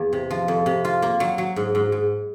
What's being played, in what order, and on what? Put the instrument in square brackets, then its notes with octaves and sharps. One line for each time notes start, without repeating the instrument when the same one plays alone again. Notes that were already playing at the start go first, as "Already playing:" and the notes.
Already playing: [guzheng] E2 A#3
C3
F3
F2
C3
F4
A#3
F#3
F#3
G#2
G#2
G#2